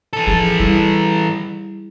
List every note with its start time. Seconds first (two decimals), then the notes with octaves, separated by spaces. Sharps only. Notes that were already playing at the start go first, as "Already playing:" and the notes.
0.13 E3 A4
0.27 F3 G#4 A6
0.60 G3 E4